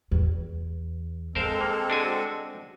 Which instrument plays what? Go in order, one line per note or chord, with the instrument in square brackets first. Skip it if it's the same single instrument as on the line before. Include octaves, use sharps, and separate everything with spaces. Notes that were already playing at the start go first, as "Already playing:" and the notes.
[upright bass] E2
[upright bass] D3 [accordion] G#3 C4 A4 [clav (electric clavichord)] A#4 C5 F5
[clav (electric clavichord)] A#3
D4 F#4 G#5